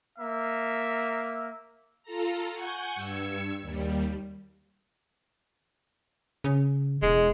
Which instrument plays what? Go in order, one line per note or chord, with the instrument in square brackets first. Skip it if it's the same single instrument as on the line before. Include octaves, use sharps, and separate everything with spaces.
[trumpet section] A#3 E5
[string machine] F4 A4 A#5
F#5 G#5 C#6 G6
G2 E6 G#6 C#7
D#2 G3
[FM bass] C#3
[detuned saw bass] E1 [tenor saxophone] G#3